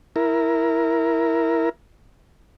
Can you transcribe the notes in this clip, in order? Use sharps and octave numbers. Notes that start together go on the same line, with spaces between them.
E4 A#4